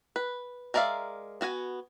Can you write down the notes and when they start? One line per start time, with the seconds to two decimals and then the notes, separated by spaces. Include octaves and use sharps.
0.16 B4
0.74 G#3 A#4 D5 E5 F5
1.41 B3 F#4 F#5 G#5